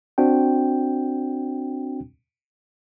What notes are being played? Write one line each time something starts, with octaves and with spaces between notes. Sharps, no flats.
C4 D4 F#4 G5